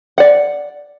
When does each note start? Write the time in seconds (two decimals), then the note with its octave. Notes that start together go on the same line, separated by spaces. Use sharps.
0.18 D5 F#5